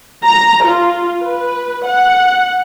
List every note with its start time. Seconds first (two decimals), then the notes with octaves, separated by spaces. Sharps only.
0.24 A#5
0.65 F4
1.23 B4
1.86 F#5